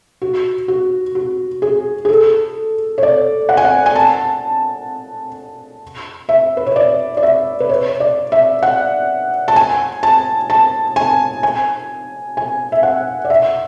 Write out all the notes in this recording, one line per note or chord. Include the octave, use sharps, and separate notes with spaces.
F#4
F#4
F#4
G#4
G#4
A4
C#5
D5
F#5
G#5
F#5
G#5
A5
E5
B4
C#5
D5
D5
E5
B4
C#5
D5
E5
F#5
A5
G#5
A5
A5
G#5
G#5
G#5
E5
F#5
D5
E5